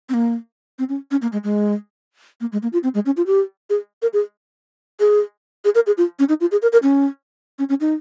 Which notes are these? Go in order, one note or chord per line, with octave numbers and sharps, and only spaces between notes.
C4
A#3
C4
C#4
C#4
A#3
G#3
G#3
A#3
G#3
A#3
F4
C4
G#3
C#4
F4
G4
G#4
A#4
G#4
G#4
G#4
A#4
G#4
F4
C#4
D#4
F4
G#4
A#4
A#4
C#4
C#4
C#4
D#4